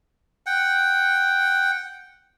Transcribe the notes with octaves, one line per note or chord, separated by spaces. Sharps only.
F#5 G5